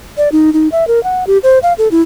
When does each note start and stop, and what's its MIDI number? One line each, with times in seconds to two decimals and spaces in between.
0.17 0.29 74
0.32 0.53 63
0.53 0.68 63
0.72 0.87 76
0.88 1.02 70
1.04 1.24 78
1.27 1.38 67
1.43 1.59 72
1.63 1.73 77
1.78 1.88 69
1.91 2.02 64